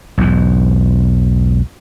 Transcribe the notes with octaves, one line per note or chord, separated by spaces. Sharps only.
B1 E2 G#2